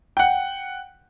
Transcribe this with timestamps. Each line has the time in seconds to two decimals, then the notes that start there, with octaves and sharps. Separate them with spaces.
0.17 F#5 G5